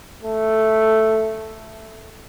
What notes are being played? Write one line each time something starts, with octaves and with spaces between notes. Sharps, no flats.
A3